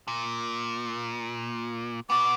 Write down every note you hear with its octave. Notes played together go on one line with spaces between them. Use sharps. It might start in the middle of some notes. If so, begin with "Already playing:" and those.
A#2
B3 F#4 D6